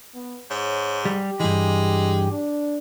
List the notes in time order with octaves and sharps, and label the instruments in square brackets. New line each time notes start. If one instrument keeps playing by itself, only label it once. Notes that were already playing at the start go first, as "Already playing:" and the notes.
[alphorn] B3
[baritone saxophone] G#2 [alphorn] C#5
[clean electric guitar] G3 [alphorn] G4
[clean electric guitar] G2 E3 [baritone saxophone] G#3
[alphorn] D4